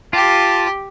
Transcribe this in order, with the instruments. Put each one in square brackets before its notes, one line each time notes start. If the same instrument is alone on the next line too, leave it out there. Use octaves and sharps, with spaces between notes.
[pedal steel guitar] F4 [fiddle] G4 [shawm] A5